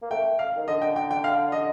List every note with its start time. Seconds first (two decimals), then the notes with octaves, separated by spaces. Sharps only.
0.02 A#3
0.11 A3 G5
0.39 F5
0.56 D#3
0.67 D3 D#5
0.82 G5
0.96 G5
1.11 G5
1.24 F5
1.52 D#5